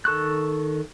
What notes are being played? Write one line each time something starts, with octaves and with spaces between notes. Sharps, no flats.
D#3 A4 C#6 F#6